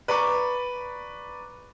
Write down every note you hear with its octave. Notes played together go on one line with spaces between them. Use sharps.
B4 D5 A#5 B5 C#6 D6